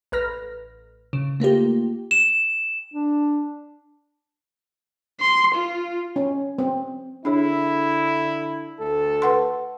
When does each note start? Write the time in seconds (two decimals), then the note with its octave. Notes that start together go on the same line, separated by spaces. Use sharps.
0.12 A1 B4 F6 A#6
1.13 C#3
1.40 A3 A#3 F4 G4
2.11 E7
2.94 D4
5.20 C6
5.55 F4
6.16 C#4
6.59 C4
7.25 D3 D4 E4 G#4 C#5
8.78 D2 A4
9.22 B4 F#5 C6